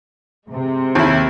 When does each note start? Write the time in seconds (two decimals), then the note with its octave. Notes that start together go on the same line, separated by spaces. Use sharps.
0.48 C3 G#3
0.95 D#2 E4